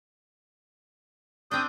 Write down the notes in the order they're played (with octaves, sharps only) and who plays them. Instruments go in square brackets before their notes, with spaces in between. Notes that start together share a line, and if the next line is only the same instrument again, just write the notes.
[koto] C4 D4 [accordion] D#6 G6